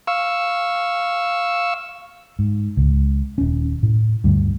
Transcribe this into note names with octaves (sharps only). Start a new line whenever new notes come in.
F5 C#6 E6
G#2
C#2
D#1 C#4
A2
D2 G2